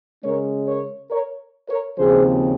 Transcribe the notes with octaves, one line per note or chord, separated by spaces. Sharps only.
C#3 G#3 C#4 A#4 C#5
A#4 C#5
A#4 C#5
A#4 C#5
D#2 C#3 F3 C4 G#4 C5